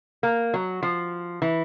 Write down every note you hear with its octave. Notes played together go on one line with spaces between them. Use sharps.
A#3
F#3
F3
E3